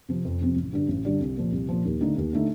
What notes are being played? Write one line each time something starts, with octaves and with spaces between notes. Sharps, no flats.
C3 F3 C4
F2
C3 F3 C4
A1
G2 D3 G3 D4
A1
G2 D3 G3 D4
C2
A#2 F3
C2
A#2 F3
D#2
D3 A3 D#4
D#2
D3 A3 D#4